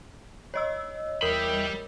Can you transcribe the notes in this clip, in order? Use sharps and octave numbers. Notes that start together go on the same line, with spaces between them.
C#5 D#5 E6
E2 G3 A#4 E5 G5 B5